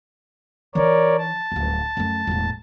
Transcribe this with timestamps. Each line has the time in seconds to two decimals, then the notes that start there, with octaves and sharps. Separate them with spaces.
0.75 E3 D#4 A#4 C#5 D5
1.18 A5
1.52 D1 F2
1.97 F#2 A3
2.27 E1 A2